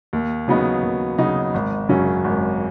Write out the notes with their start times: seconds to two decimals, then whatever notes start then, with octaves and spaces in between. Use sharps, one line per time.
0.13 D#2
0.48 C#3 F#3 B3 D#4
0.83 D#2
1.18 C#3 F#3 B3 D#4
1.54 G#1
1.89 F#2 C#3 F#3 C#4
2.24 G#1